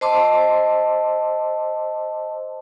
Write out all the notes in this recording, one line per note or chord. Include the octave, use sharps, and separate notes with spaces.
C5 D#5 A5 C6 D6 E6